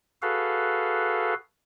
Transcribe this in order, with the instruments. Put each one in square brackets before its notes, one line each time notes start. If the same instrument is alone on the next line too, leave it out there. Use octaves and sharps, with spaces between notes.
[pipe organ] F#4 G#4 A4 B4 F5